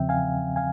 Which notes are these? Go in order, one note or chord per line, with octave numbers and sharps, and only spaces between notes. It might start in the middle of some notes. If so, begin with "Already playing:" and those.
Already playing: E2 C#3 F3 C4 E5 G5
F5 G#5
F5 G#5